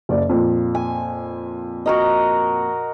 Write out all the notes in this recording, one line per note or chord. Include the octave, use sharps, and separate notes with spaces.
F#1 D5
F2 A#2
G#5
F#4 A#4 D#5